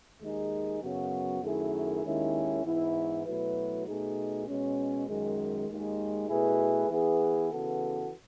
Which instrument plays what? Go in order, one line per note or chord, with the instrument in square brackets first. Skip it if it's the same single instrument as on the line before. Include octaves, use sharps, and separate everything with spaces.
[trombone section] D#2 D#3 G#3 D#4 G#4
F#2 C#3 F#3 B3 F#4
F#2 D#3 A3 E4 G#4
D#2 D#3 G#3 C#4 E4
G#2 E3 B3 E4
B2 F#3 A3 E4 B4
B2 A3 D#4 G#4
B2 G#3 C#4
F#2 D#3 G#3
D#2 D#3 G#3
B2 A3 E4 G#4 B4
E3 B3 E4 G#4 B4
C#3 E3 B3 F#4 A4